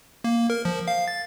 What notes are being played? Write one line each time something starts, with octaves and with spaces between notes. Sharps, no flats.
A#3
A#4
F3
F5
A6